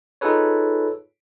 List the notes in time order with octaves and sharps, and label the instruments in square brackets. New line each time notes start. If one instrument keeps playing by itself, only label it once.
[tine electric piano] D#4 F4 G#4 A4 B4 C#5